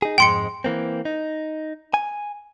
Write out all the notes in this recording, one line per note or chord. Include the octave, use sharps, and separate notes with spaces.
D#4 G#4
F2 G#2 G#3 G5 C6 C#7
E3 A#3 C4
D#4
G#5